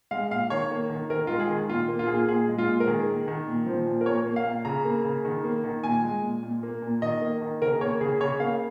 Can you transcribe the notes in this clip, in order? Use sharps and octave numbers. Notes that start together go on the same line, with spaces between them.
G#3 F5
A#2 F5
D#3 C#5
A#3
D#3
D#3 A#4
G#3 F4
G#4
D#3
A#2 F4
A#3
F4
A#2 G#4
F4
A#2 G#4
G#3
F4
A#2
A#4
D#3 G#4
A#3
D#3
A#2
F3
A#2
A#4
A#2 C#5
A#3
F5
A#2
C#3 A#5
A#3
C#3
D#3
A#3
D#3
A#2 G#5
G#3
A#2
A#2
A#3
A#2
D#3 D#5
A#3
D#3
C#3 A#4
A#3 C#5
C#3 G#4
C#3 C#5
A#3 F5